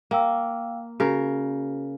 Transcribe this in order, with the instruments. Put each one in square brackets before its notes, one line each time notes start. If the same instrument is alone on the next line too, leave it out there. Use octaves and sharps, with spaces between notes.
[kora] A#3 [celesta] F5 G5 E6
[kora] C#3 A#4 [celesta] F#4